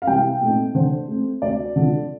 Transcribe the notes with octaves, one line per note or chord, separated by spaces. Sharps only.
F5
C2 G5
A#2 A3 C4 D#4
D3 C5
A3 C4
D2 D5
D3 F3